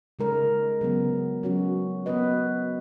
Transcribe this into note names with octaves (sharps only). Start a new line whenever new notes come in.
C#3 G#3 D#4 A#4 C#5
C#3 F#3 B3
F#3 C#4 F#4
B3 F#4 B4 D#5